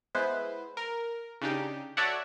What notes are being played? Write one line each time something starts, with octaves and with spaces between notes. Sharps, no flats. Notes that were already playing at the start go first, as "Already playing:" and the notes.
G#3 B3 E4 B4 C5
A#4
C#3 D4 D#4 G4
F#4 A4 C#5 D5 E5 F#5